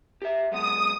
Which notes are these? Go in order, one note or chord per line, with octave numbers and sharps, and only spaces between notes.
G4 E5
F#3 G#3 B3 D#6